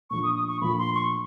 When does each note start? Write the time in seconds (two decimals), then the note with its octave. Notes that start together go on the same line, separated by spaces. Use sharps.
0.10 A#2 F3 A3 D4 F4 C#6
0.23 D#6
0.35 D#6
0.48 C#6
0.61 A#2 F3 A3 D4 F4 B5
0.79 C6
0.95 C#6